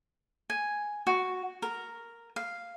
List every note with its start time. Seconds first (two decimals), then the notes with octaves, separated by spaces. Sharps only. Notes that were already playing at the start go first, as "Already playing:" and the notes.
0.50 G#5
1.07 F#4
1.62 A#4
2.36 F5